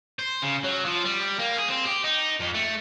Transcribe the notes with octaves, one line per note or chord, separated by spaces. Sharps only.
C5
C#3
F#3
F3
G3
A#3
G#4
C4
G4
D#4
F2
A3